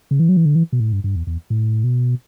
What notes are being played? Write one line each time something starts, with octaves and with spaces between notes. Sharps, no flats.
C#3
E3
F#3
E3
D3
E3
B2
A2
G2
G2
E2
E2
A2
B2